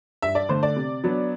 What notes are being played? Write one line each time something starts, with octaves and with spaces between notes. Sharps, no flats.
G2 E5
D5
D3 A3 C5
D5
C3
F#3 B3 D4